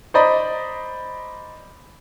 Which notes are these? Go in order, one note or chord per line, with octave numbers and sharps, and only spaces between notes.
C5 D5 D#5 A#5 B5